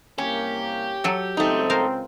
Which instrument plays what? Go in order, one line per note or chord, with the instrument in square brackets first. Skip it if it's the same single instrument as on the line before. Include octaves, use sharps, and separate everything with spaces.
[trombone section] C2 A#3 [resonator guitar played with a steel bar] C#4 [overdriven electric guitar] G4
[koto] F#3 A4
[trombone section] C#2 C4 [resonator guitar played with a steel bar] A3 D#4
[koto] A#4 C5 F5